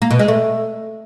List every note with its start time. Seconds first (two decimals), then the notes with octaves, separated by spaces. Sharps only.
0.02 A#3
0.11 B2
0.19 G#3
0.28 A3